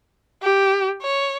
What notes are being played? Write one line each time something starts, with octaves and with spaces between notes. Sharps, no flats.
G4
C#5